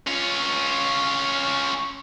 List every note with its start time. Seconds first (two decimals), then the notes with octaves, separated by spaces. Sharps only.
0.07 C#4 F4